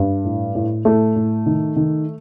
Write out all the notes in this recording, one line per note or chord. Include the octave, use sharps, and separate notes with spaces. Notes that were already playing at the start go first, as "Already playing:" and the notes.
Already playing: G2
A2
A2
A2 A3
A2
D#3
D#3